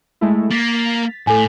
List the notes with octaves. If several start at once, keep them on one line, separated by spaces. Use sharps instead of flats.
G#3 A3 E4
A#3 A6 B6
A2 A4 G#5